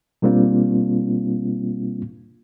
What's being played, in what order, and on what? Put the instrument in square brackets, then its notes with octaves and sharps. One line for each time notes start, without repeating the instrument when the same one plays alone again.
[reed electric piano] B2 G3 A#3 C4 D4 F4